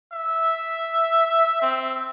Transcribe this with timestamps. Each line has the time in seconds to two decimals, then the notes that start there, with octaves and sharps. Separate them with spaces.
0.12 E5
1.62 C4